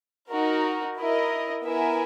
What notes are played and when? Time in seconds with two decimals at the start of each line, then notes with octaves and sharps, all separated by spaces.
0.29 D#4 F#4 A#4
0.97 E4 A#4 D#5
1.63 B3 E4 A#4 E5 G#5